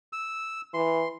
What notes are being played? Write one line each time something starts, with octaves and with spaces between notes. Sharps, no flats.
E6
E3 C6